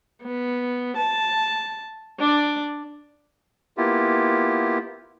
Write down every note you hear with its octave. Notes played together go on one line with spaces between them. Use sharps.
B3
A5
D4 D5
A#3 B3 E4 F4 G4